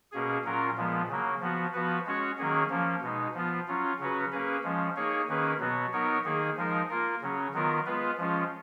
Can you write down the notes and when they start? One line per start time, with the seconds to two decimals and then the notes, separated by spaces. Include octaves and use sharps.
0.12 B2 A#3 C#4 G#4
0.45 A#2 F#3 C#4 F4 A#4
0.77 A#2 F3 G#3 B3
1.08 C#3 F#3 A#3
1.40 F3 B3 F#4
1.73 F3 B3 F#4 B4
2.06 G#3 C#4 F#4 C#5
2.38 D#3 F#3 A#3 C#4 G#4
2.70 F3 A#3 C#4
3.02 B2 G#3 D#4
3.34 F3 B3 F4
3.67 F#3 C#4 F4
3.99 C#3 F#3 C#4 F#4 B4
4.31 A#3 C#4 G#4 B4
4.64 F3 G#3 C#4
4.96 A#3 D#4 G#4 C#5
5.28 D#3 A#3 C#4 G#4 B4
5.60 B2 F#3 B3 F#4
5.93 F#3 B3 D#4 A#4 C#5
6.24 D#3 A#3 D#4 G#4
6.57 F3 G#3 D#4 A#4
6.89 A#3 F4 A#4
7.22 C#3 F#3 C#4
7.53 D#3 F#3 B3 F4 A#4
7.86 G#3 B3 F4 B4
8.18 F3 G#3 C#4 F4